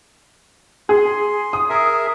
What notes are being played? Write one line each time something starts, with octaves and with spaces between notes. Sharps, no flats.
G#4 C6
D#6
G#4 A#4 E5